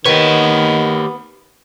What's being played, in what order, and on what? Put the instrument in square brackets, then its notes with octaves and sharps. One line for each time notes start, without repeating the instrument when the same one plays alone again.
[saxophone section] D#3 [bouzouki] B3 [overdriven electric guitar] G4 C#5